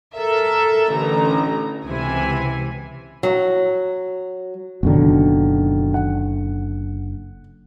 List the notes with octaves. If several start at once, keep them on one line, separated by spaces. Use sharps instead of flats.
A4 A#4 E5
A1 D3 A#5
C#2 C3 E3 G#5
F#3
F#1 B2 D3 D#3
F#5